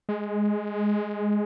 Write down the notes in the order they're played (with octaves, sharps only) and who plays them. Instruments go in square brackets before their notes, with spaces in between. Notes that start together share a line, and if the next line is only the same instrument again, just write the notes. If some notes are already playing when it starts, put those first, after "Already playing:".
[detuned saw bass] G#3